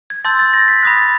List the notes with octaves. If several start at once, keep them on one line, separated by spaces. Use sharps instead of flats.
G#6
A5 C6 E6 G6 A6
A6
A#6
B6
B5 D#6 F#6 A#6
A6